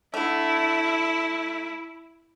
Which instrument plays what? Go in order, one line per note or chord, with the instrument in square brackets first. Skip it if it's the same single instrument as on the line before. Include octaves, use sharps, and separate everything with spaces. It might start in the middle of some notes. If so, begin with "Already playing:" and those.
[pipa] D3 A3 [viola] E4